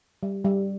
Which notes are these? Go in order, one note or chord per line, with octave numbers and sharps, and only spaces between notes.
G3
G3